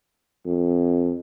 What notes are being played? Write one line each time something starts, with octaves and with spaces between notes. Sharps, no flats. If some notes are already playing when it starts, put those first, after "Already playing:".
F2